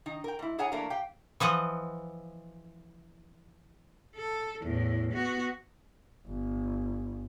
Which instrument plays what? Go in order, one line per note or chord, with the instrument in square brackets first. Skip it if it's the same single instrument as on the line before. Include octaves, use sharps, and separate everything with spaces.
[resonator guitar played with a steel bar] D#3 D#4
A#4 G5
G#2 E4
G#4 A4 C#5 F#5 G#5 A#5
E3 A3 A#3 D4 A#4
G4 F5 G5
[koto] E3 F3 D#5 F#5
[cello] A4
E2 A2
B3 F#4
[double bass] G1